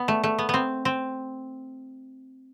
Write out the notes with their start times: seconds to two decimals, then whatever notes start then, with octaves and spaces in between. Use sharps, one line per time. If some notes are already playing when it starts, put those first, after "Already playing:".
Already playing: B3
0.08 A3
0.24 A3
0.39 B3
0.49 B3 C4
0.85 C4